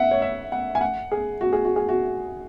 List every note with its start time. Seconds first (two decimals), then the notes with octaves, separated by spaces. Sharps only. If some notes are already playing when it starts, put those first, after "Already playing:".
Already playing: E5 F#5
0.11 C#5
0.22 E5
0.52 F#5
0.75 G#5
0.81 F#5
1.12 G#4
1.41 F#4
1.53 G#4
1.65 F#4
1.76 G#4
1.89 F#4